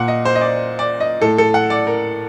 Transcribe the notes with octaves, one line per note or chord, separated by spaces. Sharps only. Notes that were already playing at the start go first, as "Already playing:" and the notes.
Already playing: A#2 F#5
D#5
C5
D#5
D5
D5
D#5
A2 A4
A4
F#5
D5
A#4